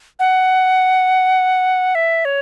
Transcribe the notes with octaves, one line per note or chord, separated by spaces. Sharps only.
F#5
E5
C#5